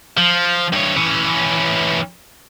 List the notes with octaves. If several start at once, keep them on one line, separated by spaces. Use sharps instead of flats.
F3
G2 C#5
E3 C#4